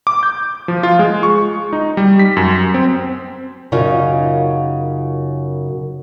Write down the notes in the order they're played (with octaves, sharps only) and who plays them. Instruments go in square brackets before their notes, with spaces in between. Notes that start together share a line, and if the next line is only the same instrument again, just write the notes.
[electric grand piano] D6
G6
F3
F4
G#3
C#6
D#4
G3
B6
F#2
C4
[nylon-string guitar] F#2 C#3 D#4 F4